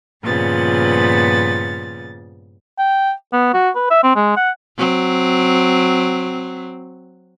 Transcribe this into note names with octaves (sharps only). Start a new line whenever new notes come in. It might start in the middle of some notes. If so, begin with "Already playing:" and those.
G2 A#2 C#3 F3 B3 A6
G5
B3
F#4
B4
E5
C4
G#3
F#5
F#3 C4